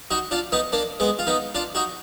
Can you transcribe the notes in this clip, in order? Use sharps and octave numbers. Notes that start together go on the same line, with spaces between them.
D#4 F#4
D4 F4
B3 D#4
A#3 D4
G#3 B3
F4
B3 D#4
D4 F4
D#4 F#4